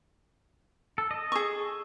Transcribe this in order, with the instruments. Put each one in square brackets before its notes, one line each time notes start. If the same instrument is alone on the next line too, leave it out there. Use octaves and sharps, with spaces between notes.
[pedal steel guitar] A4
A4 D#5
[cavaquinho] G#4 C#6